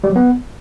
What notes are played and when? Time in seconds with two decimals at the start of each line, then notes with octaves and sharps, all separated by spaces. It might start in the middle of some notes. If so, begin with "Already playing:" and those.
0.04 G3
0.10 F#3
0.16 B3